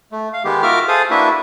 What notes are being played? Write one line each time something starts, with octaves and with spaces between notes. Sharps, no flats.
A3
F5
D#3 G#3 B3 G4
F4 F#4 A#4 E5 D6 F6
G#4 A4 C5 F5 D#6
A#3 D4 E4 F#4 B4 E5